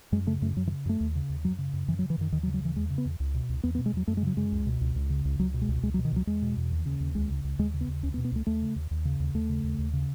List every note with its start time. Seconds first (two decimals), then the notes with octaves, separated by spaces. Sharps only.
0.12 F#2 G#3
0.27 C#3 A3
0.42 F#2 A3
0.56 F#2 F#3
0.67 E3
0.71 C#3
0.85 F#2 A3
1.00 D#2
1.15 C#3
1.29 D#2
1.44 F#2 F#3
1.58 C#3
1.73 F#2
1.88 F#2 E3
1.99 F#3
2.02 C#3
2.10 E3
2.18 F#2 D#3
2.32 D#2 D#3
2.43 F#3
2.47 C#3
2.54 F#3
2.61 D#2 E3
2.76 E2 G#3
2.90 C#3
2.98 B3
3.05 E2
3.20 C#2
3.34 B2
3.49 C#2
3.63 E2 B3
3.75 B3
3.78 B2
3.86 G#3
3.93 E2 F#3
4.07 F#2 A3
4.17 G#3
4.22 C#3 F#3
4.37 F#2 G#3
4.52 C#2
4.66 B2
4.81 C#2
4.95 C#2
5.10 C#3
5.25 C#2
5.39 C#2 F#3
5.54 B2
5.61 G#3
5.68 C#2
5.83 C#2 G#3
5.94 F#3
5.98 B2
6.05 D#3
6.12 C#2 F#3
6.27 E2 G#3
6.42 B2
6.57 E2
6.71 D#2
6.86 C#3
7.00 D#2
7.15 C#2 G#3
7.29 C#3
7.44 C#2
7.59 D#2 G#3
7.74 C#3
7.81 B3
7.88 D#2
8.03 C#2 C#4
8.14 B3
8.18 B2
8.24 B3
8.32 C#2 A3
8.47 D#2 A3
8.62 C#3
8.76 D#2
8.91 D#2
9.05 C#3
9.20 D#2
9.34 D#2 A3
9.49 C#3
9.64 D#2
9.78 D#2
9.93 C#3